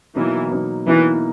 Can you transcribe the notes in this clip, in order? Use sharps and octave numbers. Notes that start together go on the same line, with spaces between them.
B2 E3 F#3 A#3 D#4
B2 F#3 A#3 D#4
B2 E3 F#3 A#3 D#4